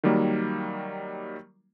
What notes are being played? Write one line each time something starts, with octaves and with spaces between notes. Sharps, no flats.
D#3 F#3 G3 A#3